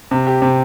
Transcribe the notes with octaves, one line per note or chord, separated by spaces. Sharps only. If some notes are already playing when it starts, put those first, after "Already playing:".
C3
G4
C3